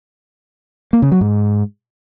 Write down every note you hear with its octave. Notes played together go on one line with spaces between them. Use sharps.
A#3
C#3
F#3
G#2